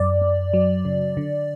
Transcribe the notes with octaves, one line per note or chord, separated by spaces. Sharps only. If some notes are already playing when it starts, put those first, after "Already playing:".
Already playing: F#2 D5
F#2
F#3
C#3
D3